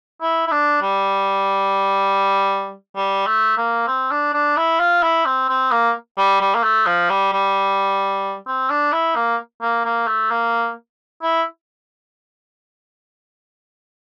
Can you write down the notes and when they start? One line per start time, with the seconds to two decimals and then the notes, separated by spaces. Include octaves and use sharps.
0.21 E4
0.47 E4
0.51 D4
0.82 G3
2.96 G3
3.27 A3
3.58 A#3
3.88 C4
4.11 D4
4.34 D4
4.57 E4
4.80 F4
5.03 E4
5.26 C4
5.49 C4
5.71 A#3
6.18 G3
6.41 G3
6.55 A#3
6.63 A3
6.86 F3
7.10 G3
7.33 G3
8.47 C4
8.70 D4
8.93 E4
9.16 A#3
9.62 A#3
9.85 A#3
10.07 A3
10.31 A#3
11.22 E4